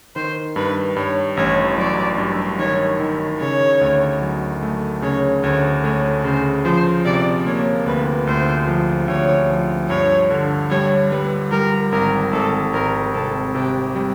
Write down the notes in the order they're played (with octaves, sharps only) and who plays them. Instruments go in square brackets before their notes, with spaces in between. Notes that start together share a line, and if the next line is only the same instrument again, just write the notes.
[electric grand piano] D#3 [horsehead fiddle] C5
[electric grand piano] G2 [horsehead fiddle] B4
[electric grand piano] G2 [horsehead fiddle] C#5
[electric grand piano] A1 [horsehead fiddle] C#5
[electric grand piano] F#3 [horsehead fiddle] D5
[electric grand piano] G2
[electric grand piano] D#3 [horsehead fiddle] C#5
[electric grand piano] D#3
[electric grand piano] C#3 [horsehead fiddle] C#5
[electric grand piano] D2
F#3
A3
[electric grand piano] C#3 [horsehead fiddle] C#5
[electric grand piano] D2 [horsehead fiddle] C#5
[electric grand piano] A3 [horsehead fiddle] C#5
[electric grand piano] C#3 [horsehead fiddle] C5
[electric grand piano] F3 [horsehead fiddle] C5
[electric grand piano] C3 [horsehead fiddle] D5
[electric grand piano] A#3 [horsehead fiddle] C#5
[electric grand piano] D2 [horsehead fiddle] B4
[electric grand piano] D2 [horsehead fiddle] C5
[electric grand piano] F3
[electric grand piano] D2 [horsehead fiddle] C#5
[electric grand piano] F3
[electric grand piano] G2 [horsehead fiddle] C#5
[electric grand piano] D3
[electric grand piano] G3 [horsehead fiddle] C#5
[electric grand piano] G3 [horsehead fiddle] B4
[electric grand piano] G3 [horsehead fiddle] A#4
[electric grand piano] G#1 [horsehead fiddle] A#4
[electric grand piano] G#1 [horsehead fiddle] A4
[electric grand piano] G#1 [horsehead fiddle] A#4
[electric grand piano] C3 [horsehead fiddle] A4
[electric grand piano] C3 [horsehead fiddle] G4
[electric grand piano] G3